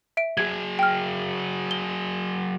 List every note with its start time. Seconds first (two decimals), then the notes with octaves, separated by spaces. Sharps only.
0.17 E5 D7
0.37 F#3 G#4 G#6
0.79 G5 F6
1.71 G7